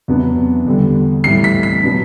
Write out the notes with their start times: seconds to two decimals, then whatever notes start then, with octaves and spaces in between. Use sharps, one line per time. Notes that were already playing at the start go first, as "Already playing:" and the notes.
0.08 E2 C3 F#3 B3 D4
0.66 E2 D3 G3
1.24 A2 E3 G3 C7
1.44 B6
1.63 B6
1.83 B2 F#3 B3 D4